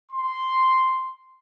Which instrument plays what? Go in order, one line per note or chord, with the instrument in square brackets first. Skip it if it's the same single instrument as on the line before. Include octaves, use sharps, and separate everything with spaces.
[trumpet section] C6